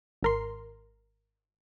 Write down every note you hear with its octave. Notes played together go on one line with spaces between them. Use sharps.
G#1 A#4 C6